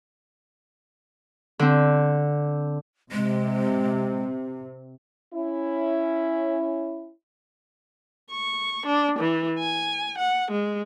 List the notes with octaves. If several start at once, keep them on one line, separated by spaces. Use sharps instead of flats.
D3 C4
C3 G#3
C#4 E4
C#6
D4
E3
G#5
F#5
G#3